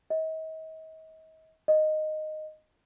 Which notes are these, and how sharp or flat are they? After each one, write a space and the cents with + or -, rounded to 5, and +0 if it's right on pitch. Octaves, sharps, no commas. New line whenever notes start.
D#5 +40
D#5 -10